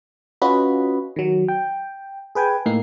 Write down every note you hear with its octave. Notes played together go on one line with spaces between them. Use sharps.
C#4 F4 F#4 B4 D#5 B5
D#3 F#3
G5
G#4 B4 G5 G#5
A2 A#3 D#4 C7